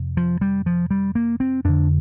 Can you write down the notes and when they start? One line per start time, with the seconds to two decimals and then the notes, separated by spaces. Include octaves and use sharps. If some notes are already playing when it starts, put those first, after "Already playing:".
Already playing: F2 C3
0.17 F3
0.41 G3
0.66 F3
0.91 G3
1.15 A#3
1.40 C4
1.64 F2 D3 D4